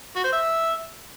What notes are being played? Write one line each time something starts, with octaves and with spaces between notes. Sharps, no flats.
F#4
C5
E5